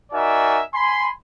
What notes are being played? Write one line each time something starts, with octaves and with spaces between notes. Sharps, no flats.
D#4 F#4 A#4 D5 E5 G#5
G#5 B5 C6